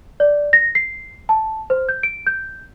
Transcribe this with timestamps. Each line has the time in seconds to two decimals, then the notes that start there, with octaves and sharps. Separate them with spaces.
0.20 D5
0.53 A#6
0.75 C7
1.29 A5
1.70 C5
1.89 G6
2.03 D7
2.26 G6